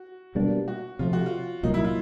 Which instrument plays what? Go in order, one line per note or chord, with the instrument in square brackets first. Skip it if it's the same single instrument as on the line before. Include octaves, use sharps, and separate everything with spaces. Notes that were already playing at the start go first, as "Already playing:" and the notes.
Already playing: [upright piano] F#4
[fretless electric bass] B2 G3 A#3 D4
[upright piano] F#4
[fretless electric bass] C3 F3 A3 [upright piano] F4
[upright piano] F#4
F4
[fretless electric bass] C2 A#2 F#3 A#3 [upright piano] D#4
[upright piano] E4
F4